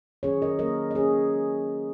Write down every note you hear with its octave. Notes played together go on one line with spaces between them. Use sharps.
D#3 F#3 C#4 G#4 C#5
A#4 D#5
F#3 A#3 C#4 A#4 D#5
D#5
F#3 A#3 C#4 G#4 C#5